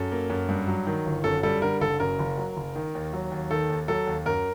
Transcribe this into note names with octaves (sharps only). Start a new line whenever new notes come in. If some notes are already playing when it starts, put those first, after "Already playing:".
Already playing: F#2 A4
A#3
F#2
G2
F#3
D#3
G1
F#2 A4
G3 A4
D3 A#4
F#1 A4
F#2 A#4
F#1
F#3
F#1
D#3
D#2
F#3
D#2
D#3 A4
D#2
F#3 A4
D#2
F#2 A#4